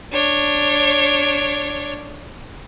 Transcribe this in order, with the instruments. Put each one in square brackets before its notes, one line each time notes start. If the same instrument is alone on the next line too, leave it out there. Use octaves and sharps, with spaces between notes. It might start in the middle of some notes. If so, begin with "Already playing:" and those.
[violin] D4 C#5